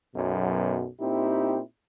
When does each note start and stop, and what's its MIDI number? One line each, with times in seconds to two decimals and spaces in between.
0.15 0.87 35
0.15 0.87 42
0.15 0.87 47
1.00 1.60 46
1.00 1.60 60
1.00 1.60 63
1.00 1.60 64
1.00 1.60 67